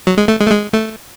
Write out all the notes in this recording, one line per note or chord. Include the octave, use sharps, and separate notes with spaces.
F#3
G#3
A3
G#3
A3
G#3
A3